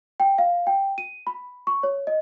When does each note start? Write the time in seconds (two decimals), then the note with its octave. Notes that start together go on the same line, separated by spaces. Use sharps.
0.20 G5
0.38 F5
0.67 G5
0.98 D#7
1.27 B5
1.67 C#6
1.83 C#5
2.07 D#5